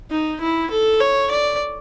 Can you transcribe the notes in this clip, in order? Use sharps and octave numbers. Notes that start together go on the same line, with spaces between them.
D#4
E4
A4
C#5
D5